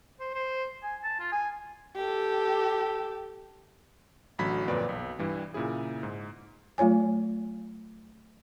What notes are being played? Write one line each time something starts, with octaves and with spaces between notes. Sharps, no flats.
C5
C5
G#5
A5
F4
G#5
G4 A4
A1 D3 F#3 B5 G#6 B6
G1 F2 A#2 B4 D5
B1
G2 E3 G3
A#2 C#3 E4 G#4
G#2
F#3 A3 F4 C#5 G#5